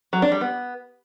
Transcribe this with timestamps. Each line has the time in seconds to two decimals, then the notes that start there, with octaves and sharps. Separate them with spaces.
0.13 F#3
0.22 D4
0.32 G3
0.41 B3